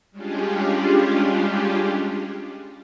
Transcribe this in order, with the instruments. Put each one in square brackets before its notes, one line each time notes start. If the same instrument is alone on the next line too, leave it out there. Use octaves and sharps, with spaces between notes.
[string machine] G3 G#3 C#4 D4 F4 G4